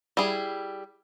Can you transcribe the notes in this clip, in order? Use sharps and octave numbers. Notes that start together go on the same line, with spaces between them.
G3 E4 G#4